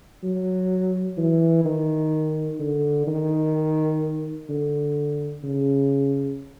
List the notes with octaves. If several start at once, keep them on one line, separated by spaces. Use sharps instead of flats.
F#3
E3
D#3
D3
D#3
D3
C#3